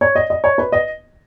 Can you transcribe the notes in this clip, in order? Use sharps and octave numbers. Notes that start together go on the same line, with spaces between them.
C#5
D#5
D#5
C#5
B4
D#5